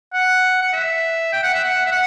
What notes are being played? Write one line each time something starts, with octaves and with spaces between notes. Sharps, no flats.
F#5
F#5
E5
G5
F#5
E5
F#5
E5
F#5